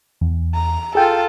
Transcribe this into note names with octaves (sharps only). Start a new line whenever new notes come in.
E2
A#5
F4 G#4 A4 G5